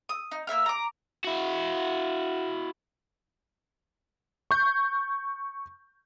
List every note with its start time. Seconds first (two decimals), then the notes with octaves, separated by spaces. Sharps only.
0.09 D#6
0.31 D#4
0.47 A#3 C4 E5 F6
0.66 A#5 D6
1.25 E4 F#4
4.51 C#6 G6